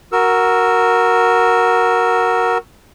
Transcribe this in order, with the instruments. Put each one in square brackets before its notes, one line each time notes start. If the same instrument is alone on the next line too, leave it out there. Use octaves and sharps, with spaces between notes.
[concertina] F#4 A#4 E6